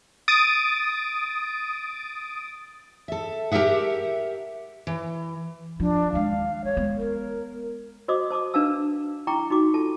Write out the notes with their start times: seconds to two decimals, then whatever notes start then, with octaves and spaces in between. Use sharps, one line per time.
0.28 D#6 A6 D7
3.08 A4 E5
3.52 G4 G#4 A#4 E5 F#5
4.87 E3
5.80 F3 D4
6.13 D#2 G#3 F5
6.65 G3 C#5
6.77 G#3 B3
6.97 A#4
8.08 F#4 C5 D#5 D6 D#6
8.30 C5 A5 D6 D#6
8.54 D4 B4 F5 A5 E6
9.27 E4 G5 A#5 C#6 D6
9.50 D#4 F#4 D6
9.74 F4 A4 A5